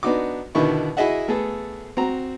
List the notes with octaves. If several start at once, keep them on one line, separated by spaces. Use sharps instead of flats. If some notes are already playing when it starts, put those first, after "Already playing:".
B3 D4 D#4 F#4 D6
B2 D3 D#3 B3 E4 C#6
E4 F#4 G#4 D#5 E5 F#5
A3 B3 G#4 A4
C4 F#4 A#5